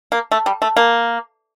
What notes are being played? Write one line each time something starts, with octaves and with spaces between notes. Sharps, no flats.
A#3
A3
G3
A3
A#3